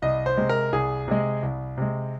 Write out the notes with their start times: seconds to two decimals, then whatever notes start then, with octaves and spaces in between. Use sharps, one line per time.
0.02 C2 D#5
0.26 C5
0.37 C3 G#3
0.49 A#4
0.73 C2 G#4
1.08 C3 G#3
1.43 C2
1.78 C3 G#3